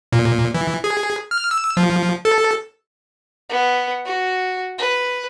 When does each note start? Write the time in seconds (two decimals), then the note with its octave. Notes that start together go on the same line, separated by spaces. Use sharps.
0.12 A#2
0.54 E3
0.84 G#4
1.31 F6
1.51 E6
1.77 F3
2.25 A4
3.50 B3
4.05 F#4
4.78 B4